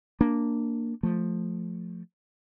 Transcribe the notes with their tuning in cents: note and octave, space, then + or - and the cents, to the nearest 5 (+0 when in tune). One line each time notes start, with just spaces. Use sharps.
A#3 -5 D4 +0
F3 +10 A3 +0